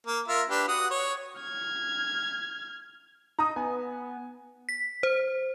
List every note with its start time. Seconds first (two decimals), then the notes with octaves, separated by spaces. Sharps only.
0.07 A#3
0.28 F4 A#4 E5
0.50 D4 G4 B4
0.68 F#4 F#5 D#6
0.91 C#5
1.40 F6 G#6
3.39 D#4 A#5 D#6
3.56 B3 G#5
4.69 B6
5.03 C5